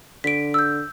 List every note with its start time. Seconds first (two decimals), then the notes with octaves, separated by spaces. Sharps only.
0.24 D3 B6 D7
0.54 E6 G6